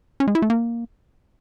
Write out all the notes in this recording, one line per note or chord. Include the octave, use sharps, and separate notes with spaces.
C#4
G#3
E4
A3
A#3